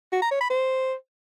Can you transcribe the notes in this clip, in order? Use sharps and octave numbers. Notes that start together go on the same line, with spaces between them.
F#4
A#5
C#5
B5
C5